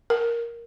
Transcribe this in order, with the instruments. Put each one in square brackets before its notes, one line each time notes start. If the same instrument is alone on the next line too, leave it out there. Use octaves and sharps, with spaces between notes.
[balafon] A#4